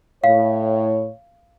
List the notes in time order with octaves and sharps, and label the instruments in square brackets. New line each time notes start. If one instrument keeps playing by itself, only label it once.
[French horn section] A2 C#5 [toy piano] F5